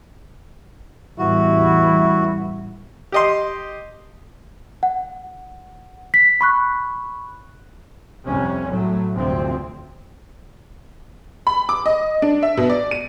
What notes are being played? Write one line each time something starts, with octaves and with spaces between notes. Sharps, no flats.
A1 E2 G3 E4 F#4
G4 D#5 C6
F#5
B6
B5 C#6 F#6
C2 F2 C3 C#4
A2 F#3 A3
G1 D2 C3 F3 C4
B5
D6
D#5
D4
E5
B2
D5
D#7